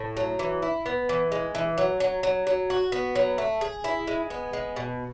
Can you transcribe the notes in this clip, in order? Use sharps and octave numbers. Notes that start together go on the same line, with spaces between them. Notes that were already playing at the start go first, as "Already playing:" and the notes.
Already playing: A2
F#3
E3
E4
B3
E3
G#3
E3
F#3
F#3
F#3
F#3
F#4
B3
F#3
A3
G#4
E4
G#3
B3
G#3
B2